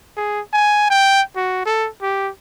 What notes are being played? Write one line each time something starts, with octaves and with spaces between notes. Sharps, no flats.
G#4
G#5
G5
F#4
A4
G4